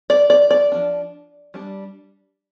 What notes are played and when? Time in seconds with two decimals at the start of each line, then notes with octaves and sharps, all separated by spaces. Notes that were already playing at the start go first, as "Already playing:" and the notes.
0.10 D5
0.30 D5
0.50 D5
0.72 F3 D4
1.54 G3 D4